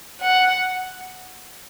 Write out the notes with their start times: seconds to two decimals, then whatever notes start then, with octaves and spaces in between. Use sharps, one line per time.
0.21 F#5